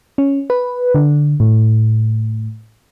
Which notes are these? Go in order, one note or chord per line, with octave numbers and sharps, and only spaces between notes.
C#4
B4
D3
A2